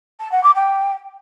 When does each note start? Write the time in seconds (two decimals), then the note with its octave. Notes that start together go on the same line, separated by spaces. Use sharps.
0.20 A5
0.31 F#5
0.43 D6
0.55 G5